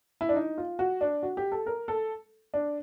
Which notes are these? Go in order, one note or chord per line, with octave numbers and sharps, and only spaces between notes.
E4
D4
D#4
F4
F#4
D4
F#4
G4
A4
A#4
A4
D4